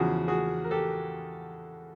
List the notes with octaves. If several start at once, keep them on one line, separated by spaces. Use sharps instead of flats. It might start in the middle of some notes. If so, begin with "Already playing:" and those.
Already playing: E2 C#3 F3 F#4 G#4
F#4 G#4
A#4
G4 A4